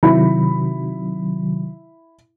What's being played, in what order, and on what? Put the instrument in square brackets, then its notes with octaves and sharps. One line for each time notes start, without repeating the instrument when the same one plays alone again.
[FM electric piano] C3 D#3 F#3 [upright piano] E4 B5